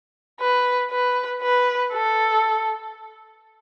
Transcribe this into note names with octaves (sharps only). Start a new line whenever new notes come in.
B4
B4
B4
A4